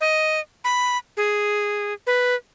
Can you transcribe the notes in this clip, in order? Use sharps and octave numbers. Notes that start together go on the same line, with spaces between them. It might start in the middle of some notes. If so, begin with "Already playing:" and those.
D#5
B5
G#4
B4